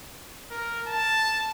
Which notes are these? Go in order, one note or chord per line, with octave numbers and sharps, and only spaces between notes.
A#4
A5